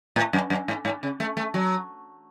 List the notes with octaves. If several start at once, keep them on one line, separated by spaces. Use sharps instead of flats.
A2
F#2
F#2
G#2
G#2
C#3
A3
A3
F#3